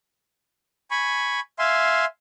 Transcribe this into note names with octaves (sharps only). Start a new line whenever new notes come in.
G#5 B5 C#6
E5 F5 G#5 C6